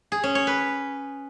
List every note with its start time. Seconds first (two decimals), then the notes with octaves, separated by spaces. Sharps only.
0.12 G#4
0.23 C#4
0.35 C#5
0.47 B4